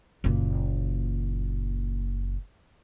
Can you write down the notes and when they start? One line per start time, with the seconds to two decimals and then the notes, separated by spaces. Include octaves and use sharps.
0.24 F#1 A#2